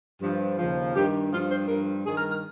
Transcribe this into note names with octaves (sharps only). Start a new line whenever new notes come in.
G2 F3
D#2 C#3 F3
G2 D#3 G4
G2 F3 F4
C5
G2 F3 A#4
G2 D#3 G#4
A#4
A#4